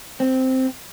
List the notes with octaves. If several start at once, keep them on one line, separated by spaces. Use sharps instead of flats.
C4